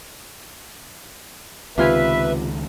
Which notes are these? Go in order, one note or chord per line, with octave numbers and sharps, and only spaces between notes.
C#2 C3 D#3 F4 B4 E5 G#5